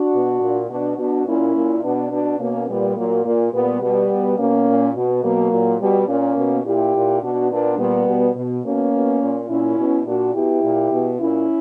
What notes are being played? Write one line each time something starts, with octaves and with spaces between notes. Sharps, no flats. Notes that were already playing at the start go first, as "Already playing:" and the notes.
Already playing: D4 F#4
B2
A#2
B2 D4 F#4
B2 D4 F#4
A#2 C#4 E4
A#2
B2 B3 D4
B2 B3 D4
B2 A#3 C#4
A#2 G3 B3
A#2 F#3 A#3
A#2
A#2 G3 B3
B2 G3 B3
B2
B2 A#3 C#4
A#2
B2
B2 F#3 A#3
A#2
B2 G3
A#2 A#3 C#4
B2
A#2 E4 G4
A#2
B2 D4 F#4
A#2 B3 D4
A#2 G3 B3
B2
B2
B2 A#3 C#4
B2
A#2
A#2 C#4 E4
B2
A#2 D4 F#4
B2 E4 G4
A#2
B2
A#2 C#4 E4